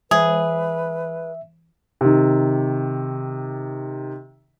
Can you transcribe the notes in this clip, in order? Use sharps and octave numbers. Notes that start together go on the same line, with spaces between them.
E3 G#4 B4 E5
C3 D#3